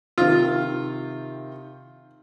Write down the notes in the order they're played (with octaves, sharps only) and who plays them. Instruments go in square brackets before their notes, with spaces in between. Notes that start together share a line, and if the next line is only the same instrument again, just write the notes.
[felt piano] C3 D#3 [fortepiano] F4